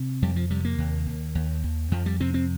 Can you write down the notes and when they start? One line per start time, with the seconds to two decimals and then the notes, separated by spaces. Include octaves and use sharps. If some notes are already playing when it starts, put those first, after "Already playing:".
Already playing: C3
0.22 F2 G3
0.36 F3
0.50 C3 G3
0.65 A#3
0.78 D#2
1.07 D#2
1.35 D#2
1.64 D#2
1.91 F2 F3
2.06 G3
2.20 C3 C4
2.34 C4